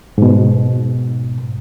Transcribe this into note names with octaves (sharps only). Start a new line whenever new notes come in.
G#2 B2